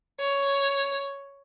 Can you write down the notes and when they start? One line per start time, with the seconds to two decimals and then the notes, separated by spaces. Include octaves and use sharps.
0.20 C#5